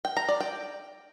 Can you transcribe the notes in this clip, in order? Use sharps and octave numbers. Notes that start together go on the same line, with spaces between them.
G5
A#5
D5
G5